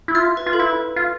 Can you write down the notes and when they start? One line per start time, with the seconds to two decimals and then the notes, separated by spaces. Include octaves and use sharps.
0.08 E4
0.15 F4 E5
0.37 B4
0.46 F4
0.53 A4
0.59 E4 B4
0.96 F4